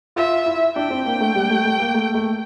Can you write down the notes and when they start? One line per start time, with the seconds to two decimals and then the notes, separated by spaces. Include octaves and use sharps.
0.16 F4 E5
0.46 E4
0.76 D4 G5
0.90 C4
1.06 A#3
1.21 A3
1.35 G3
1.50 A3
1.65 A3
1.80 A#3
1.94 A3
2.14 A3